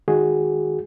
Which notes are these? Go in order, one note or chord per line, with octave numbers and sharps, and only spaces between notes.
D#3 G#3 F#4 G#4